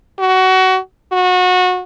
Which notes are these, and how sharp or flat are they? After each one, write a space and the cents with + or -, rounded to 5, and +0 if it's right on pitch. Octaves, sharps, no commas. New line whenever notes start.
F#4 +20
F#4 -25